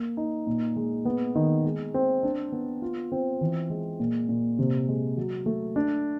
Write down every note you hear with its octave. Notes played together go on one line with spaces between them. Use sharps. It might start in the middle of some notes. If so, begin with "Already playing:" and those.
Already playing: A#3
D#4
A#2
G#3
B3
D#3
G#3
C4
D4
B3
F4
C4
E3
G#3
A#2
A#2
C3
G#3
F#3
A3
D4